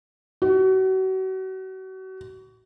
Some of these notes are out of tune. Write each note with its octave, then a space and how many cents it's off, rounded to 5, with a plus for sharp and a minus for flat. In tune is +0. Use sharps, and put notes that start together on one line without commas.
F#4 +35